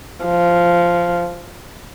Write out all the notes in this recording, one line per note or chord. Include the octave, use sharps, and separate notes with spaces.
F3